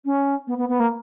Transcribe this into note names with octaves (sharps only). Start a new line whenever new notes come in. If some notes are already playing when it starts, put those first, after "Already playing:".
C#4
B3
B3
B3
A#3